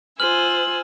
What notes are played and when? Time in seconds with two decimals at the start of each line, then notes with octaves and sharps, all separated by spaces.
0.20 F4 C5 G#5 E6 F6 F#7